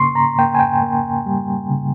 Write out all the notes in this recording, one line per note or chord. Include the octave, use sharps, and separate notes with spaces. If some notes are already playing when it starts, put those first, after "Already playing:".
Already playing: C#3 A#3 C#4 C6 C#6
A#5
A#3 G5
G#5
G5
A#3
G3
C#3